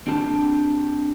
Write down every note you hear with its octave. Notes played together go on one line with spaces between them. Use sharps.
C4 D4 G4 A5